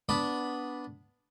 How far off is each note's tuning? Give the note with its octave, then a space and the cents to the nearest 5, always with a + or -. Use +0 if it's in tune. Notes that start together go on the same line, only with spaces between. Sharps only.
B3 +0 D4 -10 B5 -5